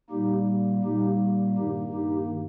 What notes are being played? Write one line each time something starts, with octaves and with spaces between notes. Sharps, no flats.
A#2 G3 A#3 D#4 G4
A#2 G3 A#3 D#4 G4
G2 D#3 A#3 D#4 G4
D#4 G4